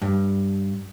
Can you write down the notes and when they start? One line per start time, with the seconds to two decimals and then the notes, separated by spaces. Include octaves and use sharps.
0.02 G2